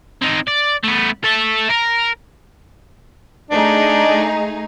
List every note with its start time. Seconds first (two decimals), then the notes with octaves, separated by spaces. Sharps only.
0.22 C4 D#4
0.48 D5
0.84 A3 B3
1.24 A4 E5
1.70 A#4
3.51 A3 D4 D#4 G#4